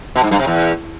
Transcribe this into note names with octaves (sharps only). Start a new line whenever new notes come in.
B2
G#2
G2
C3
E2